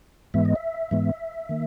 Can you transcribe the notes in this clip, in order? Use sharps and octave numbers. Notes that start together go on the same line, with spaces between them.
G#2 E3 G#3 B3 E5
D#5
E5
G#2 E3 G#3 B3
D#3 A#3